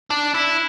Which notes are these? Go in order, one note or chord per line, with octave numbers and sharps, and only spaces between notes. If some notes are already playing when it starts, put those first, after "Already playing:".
D4
E4